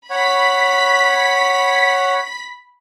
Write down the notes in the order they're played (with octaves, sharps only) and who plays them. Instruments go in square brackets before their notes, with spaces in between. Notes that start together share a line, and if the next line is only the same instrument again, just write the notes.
[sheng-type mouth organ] C#5 F#5 [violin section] B5 B6